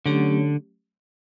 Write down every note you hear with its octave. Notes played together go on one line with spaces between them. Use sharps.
D3 F#3 A3 C#4 G4 C#5